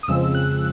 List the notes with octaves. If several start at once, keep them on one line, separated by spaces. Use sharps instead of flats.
D#6
F2 C#3 F3 G#3 C4 E6
F#6